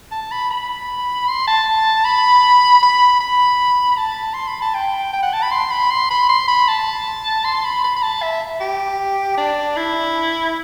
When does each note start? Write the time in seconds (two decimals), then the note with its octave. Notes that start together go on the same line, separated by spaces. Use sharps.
0.11 A5
0.31 B5
0.50 B5
1.28 C6
1.47 A5
2.04 B5
2.82 B5
3.20 B5
3.97 A5
4.33 C6
4.47 B5
4.62 A5
4.74 G5
5.13 G5
5.22 F#5
5.33 A5
5.42 B5
5.51 C6
5.71 B5
5.90 C6
6.10 B5
6.29 C6
6.48 B5
6.68 A5
7.45 C6
7.65 B5
7.84 B5
7.96 B5
8.03 A5
8.22 E5
8.60 G4
9.37 D4
9.77 E4